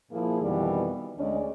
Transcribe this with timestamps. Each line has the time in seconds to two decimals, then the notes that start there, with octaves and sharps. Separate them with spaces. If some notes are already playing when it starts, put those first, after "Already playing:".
0.12 A#2 F3 A#3 E4 G#4
0.41 F2 B2 D#3 E3 G3
1.18 D2 G#3 C#4 D5 D#5